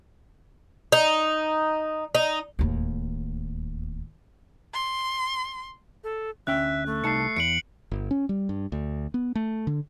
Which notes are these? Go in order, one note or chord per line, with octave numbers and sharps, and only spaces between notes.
D#4
D#4
D1 D#2
C6
A4
D2 C#4 E5 G5 F#6
A3
C2 D#4 A5 C7 C#7
E2 C#7 D7 F#7
G1
C#4
G3
G2
D2
B3
A3
D3